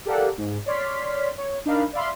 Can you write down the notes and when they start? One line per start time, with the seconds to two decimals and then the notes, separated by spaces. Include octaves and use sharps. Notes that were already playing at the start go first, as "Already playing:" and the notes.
0.06 G4 A4 A#4 D5 F5 F#5
0.38 G#2
0.66 C#5 D5 C6 F6 B6
1.38 C#5
1.66 D4 D#4 A#4 F5 B5
1.93 D5 E5 F5 B5 C6